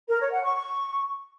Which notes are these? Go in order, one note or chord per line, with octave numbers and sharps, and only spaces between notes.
A#4
C#5
F#5
C#6
C#6